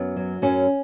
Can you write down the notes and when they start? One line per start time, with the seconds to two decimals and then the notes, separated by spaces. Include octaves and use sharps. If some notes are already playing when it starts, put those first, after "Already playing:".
Already playing: F#2 B3
0.16 F#3
0.42 F#2 C#4